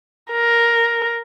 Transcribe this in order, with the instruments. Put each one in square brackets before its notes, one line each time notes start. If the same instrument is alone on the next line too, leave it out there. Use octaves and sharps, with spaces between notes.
[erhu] A#4